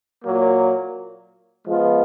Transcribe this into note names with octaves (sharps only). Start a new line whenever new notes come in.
A#2 F#3 A#3
F3 G#3 B3 F4